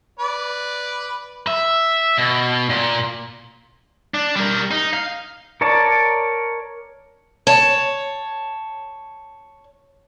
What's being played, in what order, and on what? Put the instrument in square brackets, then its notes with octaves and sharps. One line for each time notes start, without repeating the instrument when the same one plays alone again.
[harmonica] B4 D5
[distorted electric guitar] E5
B2
A#2
D4
G3 A#4
D#4
F5
[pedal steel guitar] A#4 C#5 D5 A5
[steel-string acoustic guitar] C#5 A5